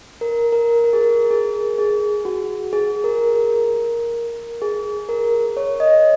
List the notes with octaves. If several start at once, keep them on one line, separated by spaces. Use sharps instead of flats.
A#4
A#4
A#4
G#4
A#4
G#4
G#4
F#4
G#4
A#4
A#4
G#4
A#4
C#5
D#5